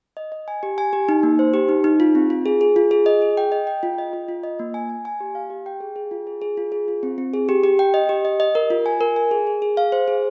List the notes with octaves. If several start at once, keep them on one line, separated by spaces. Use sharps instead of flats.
D#5
D#5
G#5
G4
G#5
G4
D#4
A#3
C5
G4
D#4
D#4
F4
C4
F4
G#4
G#4
F4
G#4
D#5
G#4
G5
D#5
G5
F4
D#5
F4
F4
D#5
A#3
G#5
G#5
G#5
G4
F5
G4
G5
G#4
G#4
F4
G#4
G#4
F4
G#4
F4
C4
C4
G#4
G4
G4
G5
D#5
G4
D#5
D#5
A#4
F4
G#5
A#4
G#5
G#4
G#4
G#4
F5
C5
G#4